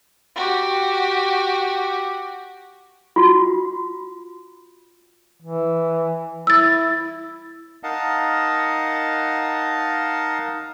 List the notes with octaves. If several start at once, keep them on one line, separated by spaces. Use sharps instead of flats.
F#4 G4
F4 F#4
E3
E4 E6 A6
D#4 A#4 D#5 F5 F#5 A5